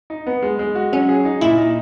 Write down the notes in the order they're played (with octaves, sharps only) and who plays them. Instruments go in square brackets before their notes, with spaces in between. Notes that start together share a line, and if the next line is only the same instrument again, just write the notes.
[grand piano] D#4
B3
G#3
G#3
F#4
[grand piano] F#3 [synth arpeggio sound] C#4
[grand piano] G#4
D#4
[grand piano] A#2 [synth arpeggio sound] E4
[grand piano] D#4